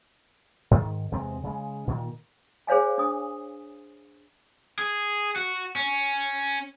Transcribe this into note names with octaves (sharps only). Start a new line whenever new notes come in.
G#2 D#3
E2 C3 G#3 C4
C#3 G#3
A#2 D#3 A#3
G#4 C5 C#5 F5 G#5
D4 D#6
G#4
F#4
C#4